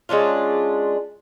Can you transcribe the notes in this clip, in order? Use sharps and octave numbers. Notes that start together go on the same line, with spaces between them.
G#3 C#4 D4 F4